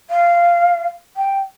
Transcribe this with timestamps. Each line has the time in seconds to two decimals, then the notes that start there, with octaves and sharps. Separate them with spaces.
0.10 F5
1.17 G5